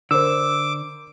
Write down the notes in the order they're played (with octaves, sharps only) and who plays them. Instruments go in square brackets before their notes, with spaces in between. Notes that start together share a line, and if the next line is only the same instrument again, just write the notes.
[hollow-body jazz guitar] D3 [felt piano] A#4 C5 [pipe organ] D6 [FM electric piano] E6